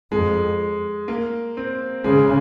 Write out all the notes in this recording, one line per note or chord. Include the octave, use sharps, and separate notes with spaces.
F2 G#3
A#3
C4
C#3 G#3